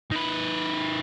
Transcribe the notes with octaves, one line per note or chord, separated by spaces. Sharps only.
D#3 B4